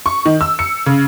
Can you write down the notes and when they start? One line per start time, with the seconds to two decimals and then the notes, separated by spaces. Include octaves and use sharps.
0.06 C#6
0.26 D#3
0.41 E6
0.59 C#7
0.86 C#3